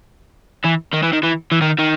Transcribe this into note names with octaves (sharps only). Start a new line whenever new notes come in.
E3
D#3
E3
D#3
E3
E3
D#3
D#3